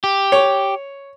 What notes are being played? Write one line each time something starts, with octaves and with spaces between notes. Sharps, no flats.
G4
C#5